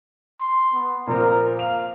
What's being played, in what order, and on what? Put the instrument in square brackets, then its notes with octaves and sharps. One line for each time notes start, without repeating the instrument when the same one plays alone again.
[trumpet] C6
B3
[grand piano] A#2 F3 C4 [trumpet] A#4
[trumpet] F5 [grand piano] F7